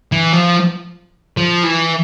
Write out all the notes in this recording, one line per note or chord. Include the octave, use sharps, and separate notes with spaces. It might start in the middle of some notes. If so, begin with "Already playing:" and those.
E3
F3
F3
E3